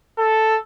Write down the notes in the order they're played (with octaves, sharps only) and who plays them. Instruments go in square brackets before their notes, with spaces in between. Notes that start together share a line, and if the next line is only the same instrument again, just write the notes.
[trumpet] A4